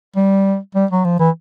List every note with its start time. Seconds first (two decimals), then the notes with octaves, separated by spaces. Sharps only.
0.16 G3
0.75 G3
0.91 F#3
1.05 F3
1.19 E3